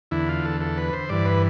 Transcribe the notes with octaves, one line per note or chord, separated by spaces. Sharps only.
E2 D3 E4
F4
A4
A4
B4
C5
G2 E3 D5
B4